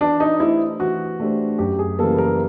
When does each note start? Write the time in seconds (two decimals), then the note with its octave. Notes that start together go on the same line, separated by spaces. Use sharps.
0.01 E3 D4
0.20 D#4
0.40 A3 D4 E4 G4 C5
0.80 E3 F#4
1.20 A3 D4 G4 C5
1.58 F#2 G4
1.79 G#4
1.99 C#3 E3 G3 A#3 A4
2.18 A#4